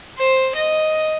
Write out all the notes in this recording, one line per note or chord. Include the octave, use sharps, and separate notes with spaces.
C5
D#5